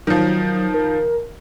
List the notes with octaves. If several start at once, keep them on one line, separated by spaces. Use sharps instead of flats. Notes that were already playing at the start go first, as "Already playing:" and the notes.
D#3 F3 F#3
A#4